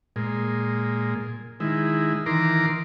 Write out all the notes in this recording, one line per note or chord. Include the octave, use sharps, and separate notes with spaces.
A#2 G#3
D#3 G#3 E4
D#3 E3 A#4 A#5 C6 D6